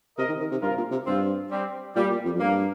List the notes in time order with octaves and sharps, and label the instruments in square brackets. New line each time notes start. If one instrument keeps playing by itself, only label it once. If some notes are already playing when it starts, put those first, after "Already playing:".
[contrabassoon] C3 [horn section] A#4 D#5
[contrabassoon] D#3
D#3
C3
[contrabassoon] G2 [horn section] F4 A#4
[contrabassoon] A#2
C3
[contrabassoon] G2 [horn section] C4 F4
[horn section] G3 C4
[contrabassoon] A#2 [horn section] G3
[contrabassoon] A#2
F2
F2
[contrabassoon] G2 [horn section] A#3